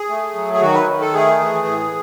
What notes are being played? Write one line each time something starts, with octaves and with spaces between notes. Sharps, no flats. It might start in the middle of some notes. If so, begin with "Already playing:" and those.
Already playing: G#4
A3
F#3
G#4
D#3 F#4
B4
D#3
A4
A3 G#4
E3
A2